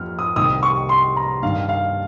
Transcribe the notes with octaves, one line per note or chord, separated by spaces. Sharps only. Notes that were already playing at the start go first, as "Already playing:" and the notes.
Already playing: F2 F6
D#6
C2 C3 D#3 D#6
C#6
C6
A#5
G2 D#3 F5
F5